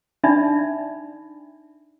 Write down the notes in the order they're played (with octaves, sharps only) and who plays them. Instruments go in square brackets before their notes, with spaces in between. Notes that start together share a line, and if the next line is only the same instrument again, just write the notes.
[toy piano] D4 D#4 D5 E5 B5